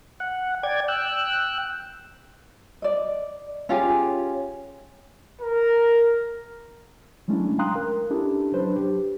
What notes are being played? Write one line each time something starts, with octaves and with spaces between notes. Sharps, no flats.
F#5
D5 G5 G#6
G5 E6 F#6
D5 D#5
C#4 F4 G4 G#4
A#4
F#3 G#3 A3 C#4 D4 E4
F5 G5 A#5 C6 D#6 F#6
A#4
C#4 D4 E4 G4 A4
F#3 D4 B4 C5
G4